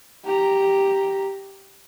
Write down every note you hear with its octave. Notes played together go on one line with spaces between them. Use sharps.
G4 A#5